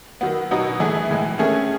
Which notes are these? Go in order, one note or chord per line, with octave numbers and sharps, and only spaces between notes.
D#3 F#3 B3
B2 F#3 B3 D#4
E3 A3 E4 G#4
A2 E3 G#3
D#3 A3 C#4 G#4